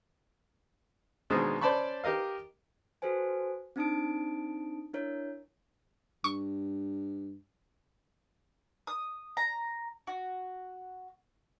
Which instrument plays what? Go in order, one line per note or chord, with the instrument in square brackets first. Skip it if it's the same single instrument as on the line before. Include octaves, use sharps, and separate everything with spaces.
[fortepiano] D#2 B2 G#3 D4 C5 D#6
C#4 C5 D5 A5 B5 C#6
G4 A#4 D#5 F5
[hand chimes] F#4 A4 B4 C5 G#5
C4 D4 D#4 A5 D#6 D7
D4 E4 A#4 C#5
[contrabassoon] G2 [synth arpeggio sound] C#6
[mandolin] D#6
A#5
F#4